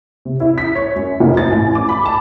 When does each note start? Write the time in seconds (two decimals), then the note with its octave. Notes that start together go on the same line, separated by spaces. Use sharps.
0.25 C3
0.40 E4
0.58 B6
0.75 C#5
0.96 F#2
1.20 F1
1.37 A6
1.51 A1
1.75 D6
1.89 B5
2.05 A5